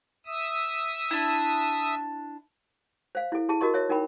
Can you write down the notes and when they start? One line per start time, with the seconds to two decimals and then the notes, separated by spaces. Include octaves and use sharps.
0.26 E5 D#6 E6
1.11 D4 E4
3.15 C5 F5
3.32 E4 A4
3.49 E4 G#4 A5
3.61 F#4 A#4 D#5 C#6
3.74 C#5 E5
3.89 D#4 A#4 G5 B5